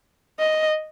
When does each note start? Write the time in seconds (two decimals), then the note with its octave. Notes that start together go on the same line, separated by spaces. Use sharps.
0.39 D#5